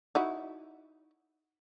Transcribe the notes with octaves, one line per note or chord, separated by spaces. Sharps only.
D#4 E4 F#4